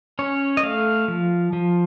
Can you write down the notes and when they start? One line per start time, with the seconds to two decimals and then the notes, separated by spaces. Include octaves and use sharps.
0.19 C#4 C#5
0.57 D#5
0.63 A3 F5
1.08 F3
1.53 F3